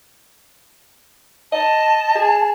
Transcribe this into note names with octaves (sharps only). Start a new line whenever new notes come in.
D#5 A5
G#4